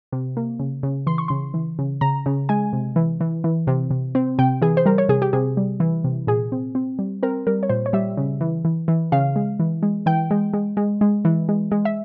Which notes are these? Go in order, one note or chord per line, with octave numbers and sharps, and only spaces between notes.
C3
A#3
C#3
C#3
E3 C6
C#6
C#3 C6
E3
C#3
C#3 A#5
C#3
G#3 G#5
C3
E3
E3
E3
C3
C3
C4
C3 G5
E3 G#4
C5
G3 A#4
C#5
C3 G#4
G4
C3 G#4
G3
E3
C3
A#2 G#4
C4
C4
G3
C4 A#4
G3 A#4
C#5
A#2 C5
C#5
G3 E5
C#3
E3
E3
E3
C#3 F5
G#3
E3
G#3
E3 G5
G#3
G#3
G#3
G#3
E3
G#3
G#3
E5